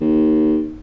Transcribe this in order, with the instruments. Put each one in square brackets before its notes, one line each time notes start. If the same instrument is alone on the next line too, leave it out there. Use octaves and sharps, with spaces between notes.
[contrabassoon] D#2